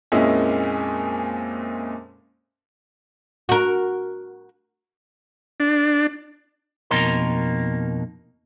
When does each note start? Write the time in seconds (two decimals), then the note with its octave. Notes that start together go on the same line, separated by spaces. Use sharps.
0.12 F2 A#2 G#3 A#3 C#4 E4
3.49 F#4 A#4
5.60 D4
6.91 F2 B2 A#3 D#4 A#4 C6